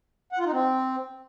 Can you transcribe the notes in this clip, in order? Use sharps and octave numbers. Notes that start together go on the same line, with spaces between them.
F#5
F4
D#4
C4